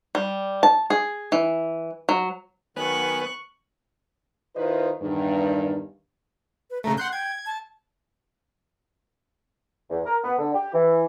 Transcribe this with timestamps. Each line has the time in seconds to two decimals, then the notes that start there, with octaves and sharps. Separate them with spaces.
0.15 G3
0.63 A5
0.90 G#4
1.32 E3
2.09 F#3
2.76 D#3 F#3 B3 C#5 G#5 C#6 F#6
4.56 D#3 E4 F4 B4 C5 D#5
5.00 E2 G2 D#3
6.70 B4
6.84 C#3 A3 A#5
6.98 F#5 C6 F#6 G6
7.13 G5 G#6
7.46 A5
9.90 E2
10.06 A#4
10.24 B3
10.39 D3
10.54 G4
10.74 E3